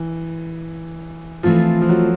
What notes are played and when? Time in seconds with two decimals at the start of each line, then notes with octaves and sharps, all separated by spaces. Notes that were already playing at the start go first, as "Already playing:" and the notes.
Already playing: E3
1.43 E3 F3 A3 C4 F4 A4
1.82 F3
1.89 F#3